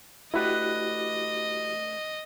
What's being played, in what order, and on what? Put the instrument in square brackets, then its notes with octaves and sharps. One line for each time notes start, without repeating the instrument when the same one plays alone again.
[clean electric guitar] A3 D4 B4 [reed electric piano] E4 F#4 G4 [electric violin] D#5